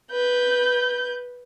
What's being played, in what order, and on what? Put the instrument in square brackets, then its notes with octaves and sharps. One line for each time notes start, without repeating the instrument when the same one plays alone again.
[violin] B4 G6